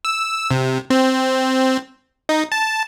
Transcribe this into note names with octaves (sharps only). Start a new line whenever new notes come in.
E6
C3
C4
D#4
A5